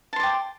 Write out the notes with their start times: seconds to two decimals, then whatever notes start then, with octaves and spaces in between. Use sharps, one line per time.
0.13 A5
0.16 C6
0.20 D5
0.23 G5